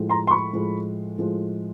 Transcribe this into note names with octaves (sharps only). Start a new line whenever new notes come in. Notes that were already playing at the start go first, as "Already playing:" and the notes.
Already playing: A2 F3 G#3
A#5 C6
C6
B5 C#6
A2 F3 G#3
A2 F3 G#3